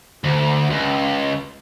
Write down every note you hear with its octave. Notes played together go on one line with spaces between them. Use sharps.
D2
C#2